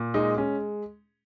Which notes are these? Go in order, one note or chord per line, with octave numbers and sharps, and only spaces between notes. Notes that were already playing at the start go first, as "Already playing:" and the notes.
Already playing: A#2
G#3 D#4
G#3 C#4